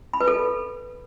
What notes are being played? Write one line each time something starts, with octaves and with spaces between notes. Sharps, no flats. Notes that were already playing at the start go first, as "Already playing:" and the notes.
B5
B4
A4